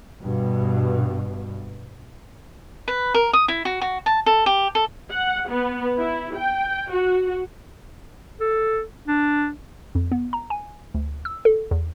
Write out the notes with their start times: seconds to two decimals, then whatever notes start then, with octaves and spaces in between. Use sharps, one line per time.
0.23 G2 B2
2.88 B4
3.14 A#4
3.33 D#6
3.48 E4
3.65 F#4
3.81 F#4
4.06 A5
4.26 A4
4.46 G4
4.75 A4
5.10 F#5
5.48 B3
5.98 E4
6.35 G5
6.90 F#4
8.41 A4
9.08 D4
9.95 F2
10.11 B3
10.33 A#5
10.50 G#5
10.94 D2
11.25 E6
11.45 A4
11.71 E2